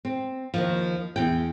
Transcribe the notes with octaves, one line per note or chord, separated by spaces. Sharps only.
C4
D#2 D#3 F3
E2 G5